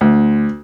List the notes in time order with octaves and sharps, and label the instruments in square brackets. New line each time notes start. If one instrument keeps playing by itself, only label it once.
[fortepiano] D2